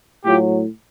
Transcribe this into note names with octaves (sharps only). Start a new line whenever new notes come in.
A2 F#3 F4 G4